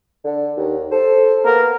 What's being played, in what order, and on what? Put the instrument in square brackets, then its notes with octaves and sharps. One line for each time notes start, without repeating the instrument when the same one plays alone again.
[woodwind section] D3
D#2
A4 C5
[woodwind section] A#3 B3 [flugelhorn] A#4